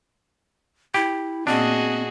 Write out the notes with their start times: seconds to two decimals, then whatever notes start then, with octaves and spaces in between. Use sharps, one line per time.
0.94 E4 G4
1.47 A#2 B3 C4 D4 F#4 G#4 D#5